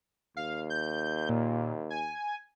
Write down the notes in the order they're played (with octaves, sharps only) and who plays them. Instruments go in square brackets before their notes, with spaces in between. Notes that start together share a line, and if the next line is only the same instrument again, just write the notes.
[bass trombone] D#2 [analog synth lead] F5
[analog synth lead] G6
A#2
G#5